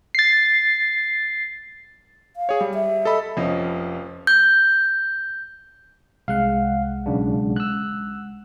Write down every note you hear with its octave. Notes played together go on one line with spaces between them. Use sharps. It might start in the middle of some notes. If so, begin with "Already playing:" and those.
A6 C7
F5
G#4 C#5
G3
E5
A4 D#5 B5
F1 F3 C#4 D#5
G6
C2 G#3 F5 F#5
B1 C#3 D4
E6 F#6